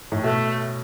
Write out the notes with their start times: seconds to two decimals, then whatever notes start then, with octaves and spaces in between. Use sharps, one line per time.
0.12 A2
0.23 B2 A3